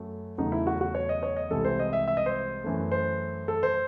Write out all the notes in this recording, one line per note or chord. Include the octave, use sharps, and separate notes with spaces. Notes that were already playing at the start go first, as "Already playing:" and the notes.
Already playing: F#2 F#3 A3
E2 C#3 F#3 A3 D#4
E4
F#4
F#4
C#5
D#5
C#5
D#5
C2 C3 E3 G#3 A4
C5
D#5
E5
E5
D#5
C5
F#2 E3 A3
C5
A4
C5